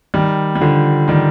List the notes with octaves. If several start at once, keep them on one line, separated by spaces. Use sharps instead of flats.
D#3 G3
G3
D3 F3
D#3 G3